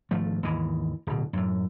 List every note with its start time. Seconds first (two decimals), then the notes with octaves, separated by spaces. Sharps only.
0.11 G#1 F3 A3
0.43 D#2 G#2 E3
1.07 D1 B2
1.33 F#2 A2